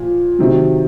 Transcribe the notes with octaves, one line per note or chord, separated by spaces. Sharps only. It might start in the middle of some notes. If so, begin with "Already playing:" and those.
Already playing: A#2 F3
C3 D#3 F#3